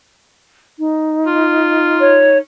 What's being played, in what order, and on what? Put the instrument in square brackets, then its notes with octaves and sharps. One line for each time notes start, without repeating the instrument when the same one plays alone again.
[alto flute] D#4
[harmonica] F4
[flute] C#5